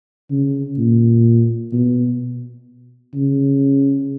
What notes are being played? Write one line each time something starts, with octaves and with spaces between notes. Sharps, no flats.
C#3
A#2
B2
C#3